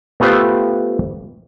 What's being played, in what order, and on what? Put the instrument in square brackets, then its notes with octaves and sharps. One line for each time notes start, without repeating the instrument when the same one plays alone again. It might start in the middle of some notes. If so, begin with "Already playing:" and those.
[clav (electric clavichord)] A3 B3 F4 G4 C5 F5